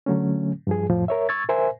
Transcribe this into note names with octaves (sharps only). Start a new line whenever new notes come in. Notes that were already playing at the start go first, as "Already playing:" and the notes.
D3 F#3 A3 C#4
G2 F3 G#4
F2 A2 F3
A#4 C#5 E5
C#6 E6 G#6 A6
A#4 C5 E5 G#5